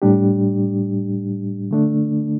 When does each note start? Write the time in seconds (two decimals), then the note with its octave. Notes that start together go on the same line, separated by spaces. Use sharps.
0.02 A2 G3 D4 G4
1.71 D3 A3 D4